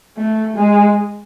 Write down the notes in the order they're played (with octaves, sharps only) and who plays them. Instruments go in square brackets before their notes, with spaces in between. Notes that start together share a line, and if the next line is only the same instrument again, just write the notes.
[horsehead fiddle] A3
G#3